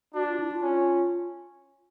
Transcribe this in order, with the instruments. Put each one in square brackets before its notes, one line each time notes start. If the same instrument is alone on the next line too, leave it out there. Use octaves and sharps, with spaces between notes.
[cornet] D4 [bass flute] F#4
[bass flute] F4
E4
F4
[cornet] C#4